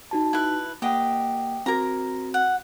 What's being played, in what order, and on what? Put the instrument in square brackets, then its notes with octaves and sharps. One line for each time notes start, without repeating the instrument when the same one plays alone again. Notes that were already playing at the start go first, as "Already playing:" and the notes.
[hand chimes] D#4 F#4 A5
[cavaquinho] E4 B4
[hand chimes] A#3 F#5 G5 [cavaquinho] G4 D#5
[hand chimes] C4 F#4 [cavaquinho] A#4 A#5
[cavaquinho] F#5